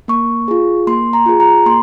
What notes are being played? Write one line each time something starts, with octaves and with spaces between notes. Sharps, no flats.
A#3 C#6
F4 G#4
A#3 C6
A#5
F4 G#4
A#5
A#3 C6